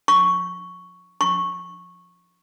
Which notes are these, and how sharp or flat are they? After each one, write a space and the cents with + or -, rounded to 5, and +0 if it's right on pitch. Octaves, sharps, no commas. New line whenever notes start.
C#6 +5
C#6 -10